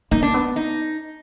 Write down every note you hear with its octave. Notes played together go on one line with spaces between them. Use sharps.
A#3 D#4
D4
B3
D#4